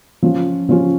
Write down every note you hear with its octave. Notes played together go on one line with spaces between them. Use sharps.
F3 C#4 F4
F3 C#4 F4